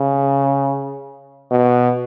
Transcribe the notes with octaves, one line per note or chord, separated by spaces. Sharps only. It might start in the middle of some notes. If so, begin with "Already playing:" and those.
Already playing: C#3
B2